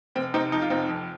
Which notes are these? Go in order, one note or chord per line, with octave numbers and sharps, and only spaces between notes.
F1 C4
C3 C4 D#4
F2 D#4
F4
F1 C4 D#4
F2